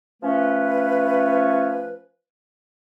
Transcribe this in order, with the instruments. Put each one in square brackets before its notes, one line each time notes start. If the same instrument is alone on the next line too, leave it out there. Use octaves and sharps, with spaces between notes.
[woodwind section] F3 A3 C#4 B4